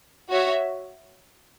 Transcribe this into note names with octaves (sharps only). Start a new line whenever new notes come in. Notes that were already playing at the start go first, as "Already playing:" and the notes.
F#4 C#5 E5